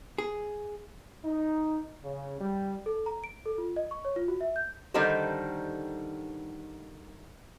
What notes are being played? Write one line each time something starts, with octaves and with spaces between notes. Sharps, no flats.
G#4
D#4
C#3
G3
A4
A#5
D7
A4
F4
D#5
C#6
C#5
F4
F#4
E5
G6
D3 D#3 G3 D#4 A4 C5